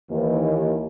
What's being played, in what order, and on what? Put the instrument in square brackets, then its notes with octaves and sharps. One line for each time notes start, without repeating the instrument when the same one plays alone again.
[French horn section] D#2 E3